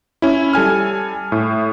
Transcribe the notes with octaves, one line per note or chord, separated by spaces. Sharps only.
C#4 E4
G3 A4 G#5 F6
A2